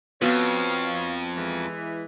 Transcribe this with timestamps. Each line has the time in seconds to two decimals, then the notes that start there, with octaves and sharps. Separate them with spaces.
0.22 F2 B3 F#4 C#5 F5
1.36 E3 G#3